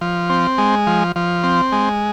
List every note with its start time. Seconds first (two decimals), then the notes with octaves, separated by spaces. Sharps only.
0.01 F3
0.30 C4
0.58 G#3
0.87 F3
1.16 F3
1.43 C4
1.72 G#3